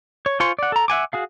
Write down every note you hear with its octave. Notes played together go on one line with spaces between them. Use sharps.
C#5
F4 C5 G#5 C6 C#6
D5 F#5
A4 A#5
E5 F#5 G#5 D6
F#4 G#4 F5